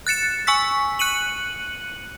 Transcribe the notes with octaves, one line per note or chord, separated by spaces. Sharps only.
F#6 A6 C#7 E7
G#5 C#6 E6 B6
F#6 C#7 D#7 F#7